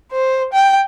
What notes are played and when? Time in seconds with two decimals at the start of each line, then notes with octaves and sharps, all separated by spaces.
0.11 C5
0.53 G5